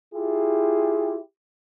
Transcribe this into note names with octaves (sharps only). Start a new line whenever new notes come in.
E4 F4 G4 G#4